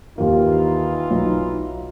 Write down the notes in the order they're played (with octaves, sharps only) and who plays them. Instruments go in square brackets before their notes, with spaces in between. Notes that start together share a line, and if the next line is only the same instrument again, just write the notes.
[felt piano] D#2 A#3 [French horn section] E3 D#4 F4
[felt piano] B1